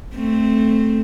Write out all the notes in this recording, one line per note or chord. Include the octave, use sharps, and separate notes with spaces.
A3 C4